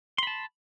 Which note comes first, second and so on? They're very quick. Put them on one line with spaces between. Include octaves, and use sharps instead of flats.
C6 B5 A5